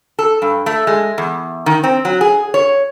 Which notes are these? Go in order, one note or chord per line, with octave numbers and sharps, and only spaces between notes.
A4
G2
A3
G#3
E2
D#3
C4
F#3
G#4
C#5